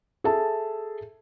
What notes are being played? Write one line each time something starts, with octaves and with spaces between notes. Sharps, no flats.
G#4 A4 E5 A5